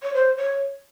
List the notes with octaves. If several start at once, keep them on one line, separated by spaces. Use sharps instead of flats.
C#5
C5
C#5